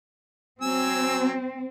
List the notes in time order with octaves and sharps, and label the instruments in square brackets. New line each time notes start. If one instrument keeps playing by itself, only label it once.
[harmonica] F#3 G#5 E6 [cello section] C4